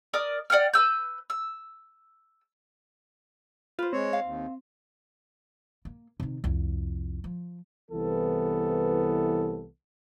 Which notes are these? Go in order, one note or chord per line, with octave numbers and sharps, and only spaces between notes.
A#4 D5 D6 D#6
D5 F#5 G5 F6
B4 E6 G6
E6
F4 B4 C5
G#3 C4 C#5
F5
D#2
A#3
C3 D#3
C2 F2
F3
C2 E3 B3 A4